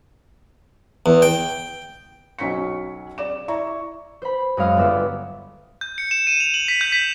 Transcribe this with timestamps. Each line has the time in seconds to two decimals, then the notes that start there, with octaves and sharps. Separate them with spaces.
1.06 E2
1.22 G5
2.39 B1 F#3 C#4 C#6 B6 C#7
3.18 D5 D6 E7
3.48 E4 D5 A#5 C#6
4.22 C5 B5
4.57 F#2 G#3 C#4 F5 D#6
4.77 G1 B3 D5 E5 C6
5.81 G6
5.98 C#7
6.11 E7
6.27 D#7
6.40 F7
6.54 F#7
6.68 B6
6.81 G6
6.92 B6